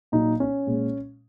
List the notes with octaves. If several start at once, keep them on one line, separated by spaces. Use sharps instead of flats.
A#2 F#3 D#4
C#4
A#2 G#3